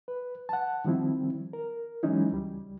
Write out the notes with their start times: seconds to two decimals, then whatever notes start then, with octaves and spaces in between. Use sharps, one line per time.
0.08 B4
0.49 F#5 A5
0.85 D#3 F3 G3 C4 E4
1.53 A#4
2.03 E3 F#3 G#3 C#4 D#4 E4
2.32 C#2 G3